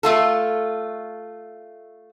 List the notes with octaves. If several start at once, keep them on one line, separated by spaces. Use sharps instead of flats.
A3 F4 A4